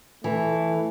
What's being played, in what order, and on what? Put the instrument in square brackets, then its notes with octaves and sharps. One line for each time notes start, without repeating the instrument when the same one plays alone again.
[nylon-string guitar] E3 [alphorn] A3